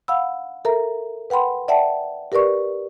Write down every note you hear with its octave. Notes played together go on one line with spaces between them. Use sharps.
F5 F#5 B5 E6
A4 A#4 E5 A#5
B4 F#5 G5 B5 C6
D5 E5 F#5 G5 A5
G4 A#4 B4 D5 C#6